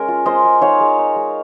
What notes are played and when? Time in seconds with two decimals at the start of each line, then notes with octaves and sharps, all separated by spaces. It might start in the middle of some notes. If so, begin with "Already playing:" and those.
Already playing: G#3 C#4 A#4
0.08 F4
0.25 G#3 C5 D#5
0.45 G#3
0.61 D#4 C#5 F5
0.81 G#3
0.99 D#4
1.16 G#3